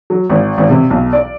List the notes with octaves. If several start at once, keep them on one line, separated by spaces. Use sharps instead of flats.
F#3
G#1
G#1
C3
B1
D5